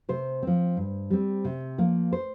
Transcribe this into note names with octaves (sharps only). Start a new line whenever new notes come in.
C3 C5
F3 C4
G2
G3 C4
C3
F3 A#3
C5